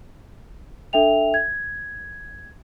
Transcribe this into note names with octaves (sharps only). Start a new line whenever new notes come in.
D4 A4 E5 G5 F7
G#6